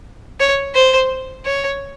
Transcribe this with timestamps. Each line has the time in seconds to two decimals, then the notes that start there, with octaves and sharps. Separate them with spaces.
0.40 C#5
0.75 C5
1.45 C#5